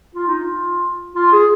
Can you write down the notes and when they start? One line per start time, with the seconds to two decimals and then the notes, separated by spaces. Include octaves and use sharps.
0.15 F4
0.28 D#4
0.39 F4
1.16 F4
1.32 G#4